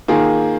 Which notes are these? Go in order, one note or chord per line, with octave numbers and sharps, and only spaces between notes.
D#3 A#3 F4 G#4